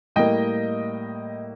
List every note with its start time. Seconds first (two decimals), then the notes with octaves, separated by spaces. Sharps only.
0.16 A2 G3 A#3 D#5 G5